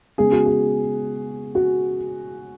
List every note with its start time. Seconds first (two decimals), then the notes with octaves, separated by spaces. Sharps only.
0.18 C#3 G#3 B3 G#4
0.32 F#4
0.46 G#4
1.55 F#4